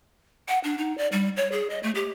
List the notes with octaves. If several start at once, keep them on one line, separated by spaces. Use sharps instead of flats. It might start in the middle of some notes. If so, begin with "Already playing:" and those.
F#5
D4
D#4
D5
G3
C#5
G#4
D#5
A3
G4